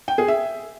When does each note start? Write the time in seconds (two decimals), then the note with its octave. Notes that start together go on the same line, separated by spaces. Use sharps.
0.08 G5
0.18 G#4
0.28 E5